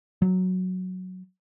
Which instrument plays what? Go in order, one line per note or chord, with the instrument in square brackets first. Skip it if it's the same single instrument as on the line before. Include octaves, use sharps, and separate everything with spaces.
[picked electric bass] F#3